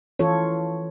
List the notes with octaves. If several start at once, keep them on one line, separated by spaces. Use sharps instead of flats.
E3 F4 A4 C#5